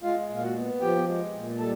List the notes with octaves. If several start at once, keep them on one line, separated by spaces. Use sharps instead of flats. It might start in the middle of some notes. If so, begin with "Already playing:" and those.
G#3 F4 F5
A#2
F5
F#4 F#5
B3
F3 G4 G5
G#3
A#2
G3 A4 A5